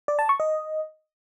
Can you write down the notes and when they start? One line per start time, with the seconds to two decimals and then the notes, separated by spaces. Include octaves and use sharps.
0.08 D5
0.19 A5
0.29 C#6
0.40 D#5